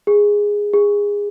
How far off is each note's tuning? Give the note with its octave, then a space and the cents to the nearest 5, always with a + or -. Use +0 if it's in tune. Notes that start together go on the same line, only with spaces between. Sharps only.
G#4 -10
G#4 -20